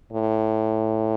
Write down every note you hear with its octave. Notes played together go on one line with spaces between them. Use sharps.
A2